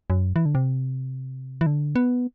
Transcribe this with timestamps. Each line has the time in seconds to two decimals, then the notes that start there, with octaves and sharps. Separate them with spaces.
0.10 F#2
0.36 E3
0.46 D3
0.55 C3
1.61 E3
1.66 D3
1.96 B3